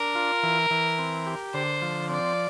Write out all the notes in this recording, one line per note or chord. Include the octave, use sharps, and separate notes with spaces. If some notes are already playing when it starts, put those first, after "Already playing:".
Already playing: D4 A#4
F4
E3
E3
C4
G4
D3 C5
F3
C4 D5